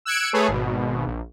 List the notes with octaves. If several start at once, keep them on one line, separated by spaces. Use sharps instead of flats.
E6 F#6 G#6 C#7 D7
A3 G#4 A4 B4 C#5
G#1 B2
A#1